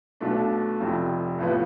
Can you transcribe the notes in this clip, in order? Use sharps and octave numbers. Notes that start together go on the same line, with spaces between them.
B1 B2 A3 D4
F1 F2 C3
A1 A2 F3 B3 F4